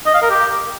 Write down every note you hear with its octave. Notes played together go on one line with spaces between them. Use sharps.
D#5
F5
A#4
G4